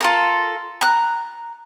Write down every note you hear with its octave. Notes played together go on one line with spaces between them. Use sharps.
F4 A4 A#4
A#5 F#6